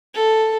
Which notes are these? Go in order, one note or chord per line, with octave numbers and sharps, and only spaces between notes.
A4